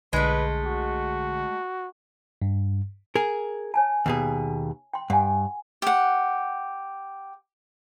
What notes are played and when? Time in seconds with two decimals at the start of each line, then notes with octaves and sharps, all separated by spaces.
0.13 B1 D3 G#3 A3 B4
0.65 F#4
2.42 G2
3.15 G#4 A#4
3.74 C#5 G#5 A5
4.06 D#2 B2 G#4
4.94 G5 C6
5.10 G2 F#5 G#5
5.82 G4 F#5